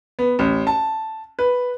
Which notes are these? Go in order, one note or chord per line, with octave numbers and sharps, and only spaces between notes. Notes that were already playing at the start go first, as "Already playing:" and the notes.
B3
A1
A5
B4